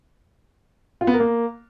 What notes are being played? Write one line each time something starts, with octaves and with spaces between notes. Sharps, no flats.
F4
B3
A#4
A#3